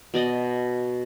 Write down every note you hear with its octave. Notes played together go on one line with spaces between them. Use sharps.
B2 D5 D#5